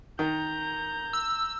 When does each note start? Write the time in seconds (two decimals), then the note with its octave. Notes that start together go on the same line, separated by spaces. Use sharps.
0.19 D#3 A#5 G6
1.13 E6